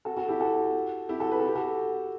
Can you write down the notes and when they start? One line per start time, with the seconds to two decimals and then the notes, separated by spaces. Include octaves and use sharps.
0.05 F#4 A4
0.17 F#4 A4
0.28 E4 G4
0.40 F#4 A4
1.09 E4 G4
1.20 F#4 A4
1.31 B4
1.39 A4
1.47 G4
1.55 F#4 A4